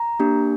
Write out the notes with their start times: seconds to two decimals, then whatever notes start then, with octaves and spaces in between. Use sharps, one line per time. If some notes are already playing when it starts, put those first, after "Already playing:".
Already playing: A#5
0.20 A#3 D4 G4